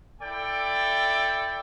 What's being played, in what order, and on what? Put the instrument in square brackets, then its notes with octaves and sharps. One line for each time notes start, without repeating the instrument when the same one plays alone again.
[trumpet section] E4 A4 D5 G5